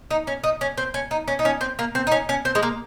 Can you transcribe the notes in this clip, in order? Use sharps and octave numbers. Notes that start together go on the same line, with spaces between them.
D#4
C#4
D#4
C#4
C4
C#4
D#4
C#4
D#4
C#4
C4
A#3
C4
D#4
C#4
C#4
C4
G#3
A#3